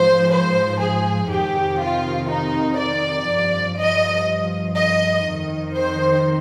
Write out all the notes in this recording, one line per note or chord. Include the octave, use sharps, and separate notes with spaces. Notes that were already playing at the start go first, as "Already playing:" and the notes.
Already playing: G#2 F3 C5
C5
G#4
F2 C3 D#3 G4
F4
D#4
D5
G2 F3
D#5
D#5
F2 D#3
C5